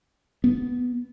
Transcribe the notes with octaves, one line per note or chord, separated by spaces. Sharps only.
B3